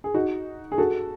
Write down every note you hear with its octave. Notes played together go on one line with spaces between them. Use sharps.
G#4
D#4 F#4
G#4
F#4 A4